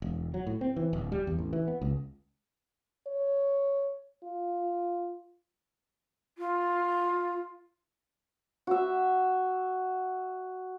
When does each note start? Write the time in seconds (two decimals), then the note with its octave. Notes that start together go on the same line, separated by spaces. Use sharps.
0.02 E1
0.34 F#3
0.47 A2
0.61 C4
0.76 E3
0.93 D1
1.12 G3
1.27 E2
1.39 A1
1.53 E3
1.68 B3
1.82 C#2
3.07 C#5
4.24 F4
6.38 F4
8.67 F#4 E5